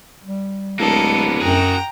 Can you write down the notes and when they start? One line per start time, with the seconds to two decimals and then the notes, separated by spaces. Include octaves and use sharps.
0.24 G3
0.79 D1 G#3 A#3 B3 A4 A#4
1.41 F#2 F#4 G#4 G5 A#5